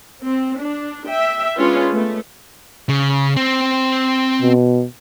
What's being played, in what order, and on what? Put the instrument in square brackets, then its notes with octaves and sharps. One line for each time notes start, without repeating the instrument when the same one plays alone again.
[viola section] C4
D4
E5 G5
G#3 C#4 D4 F4 B4
A3 B3
[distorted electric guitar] C#3
C4
[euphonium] B2